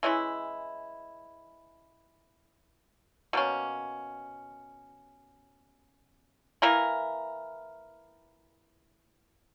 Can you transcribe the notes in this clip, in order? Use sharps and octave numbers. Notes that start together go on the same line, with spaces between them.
E3 G#3 C#4 E4
B2 A#3 C#4
E3 A#3 E4 A#4